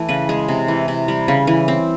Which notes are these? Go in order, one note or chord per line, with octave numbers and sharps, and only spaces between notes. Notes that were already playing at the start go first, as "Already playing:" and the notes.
Already playing: E3 A3
C#3 B4
G#3
C3
E3
C3
G3
C#3
E3
C4